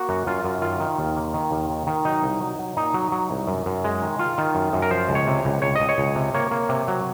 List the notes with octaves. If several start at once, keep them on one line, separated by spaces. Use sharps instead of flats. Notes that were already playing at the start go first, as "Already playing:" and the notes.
Already playing: A#3 F#4
F#2
F#2 F4
F#2
D#3 F4
D#3
D#2
A#3
D#3
D#2
D#3
D#3
F#3 D#4
C2
F#3
F#3
A#2 D#4
F#3
F#3
C2
F#2
F#2
G#3
D#3
D#3 F4
D#3
F#2
F#2
A#4
F3 C5
C#2
C#5
C3
C#2
C#2 C#5
C#2 D#5
C#5
C#2
C3
A#3 C#5
A#3
C3
F#3